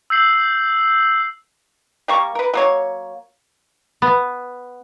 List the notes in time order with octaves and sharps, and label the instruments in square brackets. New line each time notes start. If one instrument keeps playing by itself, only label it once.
[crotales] E6 G6 C7 F#7
[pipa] G3 A#3 C#6
A#4 B4
F#3 A#3 C#5
[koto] B3